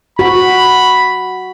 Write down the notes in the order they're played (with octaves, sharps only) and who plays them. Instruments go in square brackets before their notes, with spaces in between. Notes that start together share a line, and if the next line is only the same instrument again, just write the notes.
[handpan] F#4 [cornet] B5